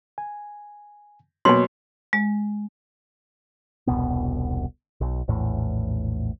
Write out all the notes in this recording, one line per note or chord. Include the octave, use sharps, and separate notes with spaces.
G#5
B2 F#3 A#3 C#5 G#5 C6
G#3
E1 C2 B2 B3
B1
A#1 E2 A2